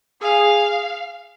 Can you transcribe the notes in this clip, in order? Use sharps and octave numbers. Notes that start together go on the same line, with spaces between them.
G#4 F5